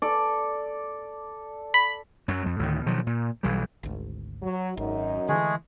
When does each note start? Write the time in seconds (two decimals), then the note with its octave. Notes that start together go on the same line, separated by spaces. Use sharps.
0.02 A4 D5
1.74 B5
2.28 F#2 F#3
2.46 F2
2.59 D2 A2 D#3
2.86 B2 D#3 F3 F#3
3.07 A#2
3.43 B1 E3 G3
3.83 G#1 D2
4.43 F#3
4.77 G#1 F#2 D#4
5.29 D3 E3 G#3 A3 G#4